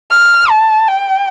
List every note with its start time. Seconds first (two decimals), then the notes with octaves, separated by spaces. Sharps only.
0.11 F6
0.50 A5
0.88 G5